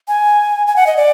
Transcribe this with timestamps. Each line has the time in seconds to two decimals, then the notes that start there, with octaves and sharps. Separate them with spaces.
0.08 G#5
0.67 G#5
0.76 F#5
0.87 D#5
0.97 D5